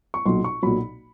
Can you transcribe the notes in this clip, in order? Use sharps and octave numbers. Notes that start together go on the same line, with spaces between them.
C#6
B1 A#2 F#3 C6
C#6
B1 A#2 F#3 B5